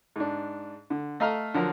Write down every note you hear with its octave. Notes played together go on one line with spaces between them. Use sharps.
G#2 D4
D3
A3 D#5 F5 A#5 F6
D3 F3 F#3 A#4